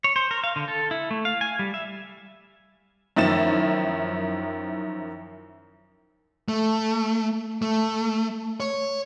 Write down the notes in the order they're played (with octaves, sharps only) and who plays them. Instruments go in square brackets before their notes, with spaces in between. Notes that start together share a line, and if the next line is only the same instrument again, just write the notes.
[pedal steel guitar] C#5
C5
A#4
F5
D3
A4
E4
A3
F5
G#5
G3
E5
[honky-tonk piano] F#2 D#3 F3 E4 A6 E7
[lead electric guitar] A3
A3
C#5